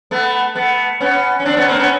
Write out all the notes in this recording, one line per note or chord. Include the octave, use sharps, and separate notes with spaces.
A3 B3
A3 B3
B3 C#4
C#4
C4 D4
B3 C#4
A#3 C4
B3 C#4